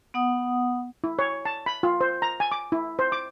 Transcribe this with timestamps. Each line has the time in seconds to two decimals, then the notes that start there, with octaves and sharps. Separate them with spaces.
0.14 B3 F#5 D#6
1.04 E4
1.19 C#5
1.45 A5
1.66 B5
1.83 F4
2.01 C5
2.22 A#5
2.40 G#5
2.52 D6
2.72 E4
2.99 C5
3.12 D6